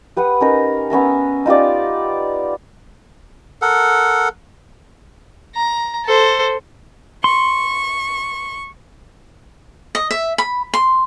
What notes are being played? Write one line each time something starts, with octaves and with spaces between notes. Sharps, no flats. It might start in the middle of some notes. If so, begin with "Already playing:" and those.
G4 B4 F#5 D#6
C#4 D#4 A#4
B3 C#4 E5 A#5
D#4 F4 G4 D5
A4 A#4 F#5
A#5
A4 C5
C6 C#6
D#5
E5
B5
C6